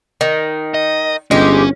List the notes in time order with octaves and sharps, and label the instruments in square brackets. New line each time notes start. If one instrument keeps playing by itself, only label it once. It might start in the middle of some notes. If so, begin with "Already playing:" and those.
[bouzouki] D#3
[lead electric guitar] D#5
[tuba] G1 [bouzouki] G#3 G4 [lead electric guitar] C#4